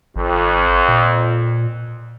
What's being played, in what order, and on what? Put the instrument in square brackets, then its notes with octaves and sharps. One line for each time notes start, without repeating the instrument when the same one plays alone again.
[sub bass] G#1 [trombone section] F2
[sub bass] A#2